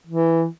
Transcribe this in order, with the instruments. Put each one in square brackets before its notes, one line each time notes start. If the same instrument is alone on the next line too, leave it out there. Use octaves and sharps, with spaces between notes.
[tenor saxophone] E3